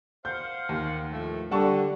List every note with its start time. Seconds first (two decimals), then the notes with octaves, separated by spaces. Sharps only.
0.25 C5 F5 F#5 G6
0.69 D#2
1.10 A2 F3 A3
1.51 D3 G3 F#5 A5 C#6